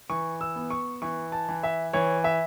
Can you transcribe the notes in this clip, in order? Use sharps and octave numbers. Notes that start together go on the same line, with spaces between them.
E3 C#6
E6
B3
C#6
E3 C#6
A5
E3
E5
E3 C#5
E5